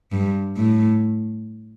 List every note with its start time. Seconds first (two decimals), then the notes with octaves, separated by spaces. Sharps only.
0.12 G2
0.57 A2